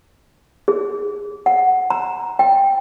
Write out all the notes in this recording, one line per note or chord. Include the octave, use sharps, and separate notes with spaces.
G#4
F#5
A#5
G5